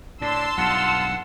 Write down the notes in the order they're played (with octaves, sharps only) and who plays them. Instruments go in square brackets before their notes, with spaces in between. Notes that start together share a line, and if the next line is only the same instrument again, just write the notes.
[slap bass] A2 [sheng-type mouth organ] D4 [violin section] A5 C6 E6
[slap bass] B1 G2 [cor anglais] F4 [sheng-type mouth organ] F#5